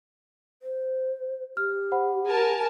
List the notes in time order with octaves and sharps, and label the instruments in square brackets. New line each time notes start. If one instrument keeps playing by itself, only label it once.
[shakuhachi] C5
[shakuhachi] G4 [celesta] F6
[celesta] C5 F#5 B5
[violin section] A#4 G#5 A5